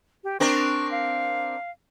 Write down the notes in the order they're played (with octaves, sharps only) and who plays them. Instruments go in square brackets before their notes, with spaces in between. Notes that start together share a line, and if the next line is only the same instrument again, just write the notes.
[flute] G4
[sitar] C4 D4 A#4 [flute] C#6
[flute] F5